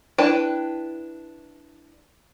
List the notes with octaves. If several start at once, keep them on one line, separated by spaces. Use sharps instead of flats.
D4 E4 B4 G5 A5